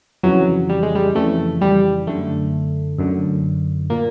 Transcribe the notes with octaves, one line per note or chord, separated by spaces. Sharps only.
F2 C#3 E3 F#3
G3
G#3
G3
F2 C#3 E3 A3
G3
F#2 D3 A3
F#2 D3
A#2 A#3